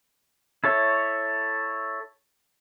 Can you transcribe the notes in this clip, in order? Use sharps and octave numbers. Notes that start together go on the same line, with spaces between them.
E4 A4 C#5 E5